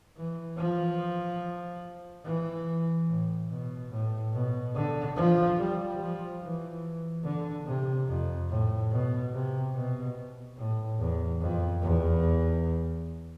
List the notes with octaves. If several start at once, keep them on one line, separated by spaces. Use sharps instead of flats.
E3
F3
E3
A2
B2
A2
B2
D3
F3
G3
F3
E3
D3
C3
F2
A2
B2
C3
B2
A2
E2
F2
E2